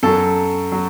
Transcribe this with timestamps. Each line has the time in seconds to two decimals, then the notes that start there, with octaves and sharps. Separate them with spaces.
0.03 F#2 F#3 A4
0.72 F#3